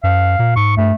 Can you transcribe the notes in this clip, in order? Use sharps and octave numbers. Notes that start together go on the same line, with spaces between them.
F#2 F5
A#2
G#2 C#6
G2 A3